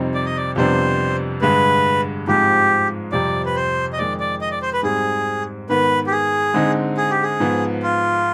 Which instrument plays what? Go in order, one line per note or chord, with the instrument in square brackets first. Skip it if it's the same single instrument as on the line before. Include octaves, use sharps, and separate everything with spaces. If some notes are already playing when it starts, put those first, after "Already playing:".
Already playing: [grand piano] F2 C3 G3 C4 D#4
[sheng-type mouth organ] D5
D#5
D5
[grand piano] F2 C3 G3 B3 D4 [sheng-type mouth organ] C5
[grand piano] G2 D3 G#3 [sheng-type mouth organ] B4
[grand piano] G#2 F3 G#3 C4 [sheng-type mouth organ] G4
[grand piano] F2 C3 G3 C4 [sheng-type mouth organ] D5
[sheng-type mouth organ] B4
C5
D#5
[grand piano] F2 D#3 G#3 [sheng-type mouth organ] D5
[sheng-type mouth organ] D5
D#5
D5
C5
B4
[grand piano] G#2 G3 C4 [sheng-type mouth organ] G#4
[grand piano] G#2 D#3 B3 [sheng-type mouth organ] B4
[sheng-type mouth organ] G4
G#4
[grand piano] D3 G#3 C4 D#4
[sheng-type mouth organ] G#4
G4
G#4
[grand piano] G#2 F3 B3
[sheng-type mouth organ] F4